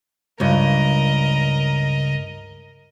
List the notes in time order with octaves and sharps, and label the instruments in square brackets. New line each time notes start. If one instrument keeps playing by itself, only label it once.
[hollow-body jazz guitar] C#2 G2 [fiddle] A#4 D#5